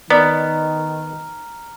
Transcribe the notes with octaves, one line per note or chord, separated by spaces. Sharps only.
D#3 B3 D5 A#5 F6